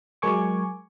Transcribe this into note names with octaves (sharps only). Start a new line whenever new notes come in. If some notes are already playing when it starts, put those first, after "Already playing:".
F#3 G#3 A#4 G#5 C#6 D6